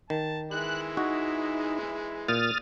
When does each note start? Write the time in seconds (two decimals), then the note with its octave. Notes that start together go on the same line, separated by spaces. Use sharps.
0.10 D#3 A5
0.51 E3 G#3 E4 F#6
0.97 D#4 F#4
2.28 A#2 D#6 F6 A6